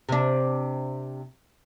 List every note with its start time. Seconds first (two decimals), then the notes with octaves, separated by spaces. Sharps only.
0.09 C3 D4